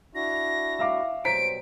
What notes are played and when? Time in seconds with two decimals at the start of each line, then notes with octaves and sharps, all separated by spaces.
0.15 D4 E4 F#4 A#6
0.79 E5 F5 D6
1.25 B2 F#3 G3 C5 A#5 B6 D7